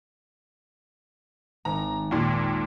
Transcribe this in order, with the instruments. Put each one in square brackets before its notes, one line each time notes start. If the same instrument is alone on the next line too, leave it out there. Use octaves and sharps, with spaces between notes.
[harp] G#1 [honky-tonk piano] A#5
[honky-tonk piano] D#2 A#2